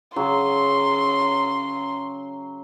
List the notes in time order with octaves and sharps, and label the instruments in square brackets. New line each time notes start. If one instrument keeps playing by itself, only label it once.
[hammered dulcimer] C#3 F#3 [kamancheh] C6